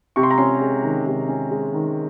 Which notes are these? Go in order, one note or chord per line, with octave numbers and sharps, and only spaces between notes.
C3 C#6
C6
A#5
C#4 C6
G#3
D#3
C3
C#4
G#3
D#3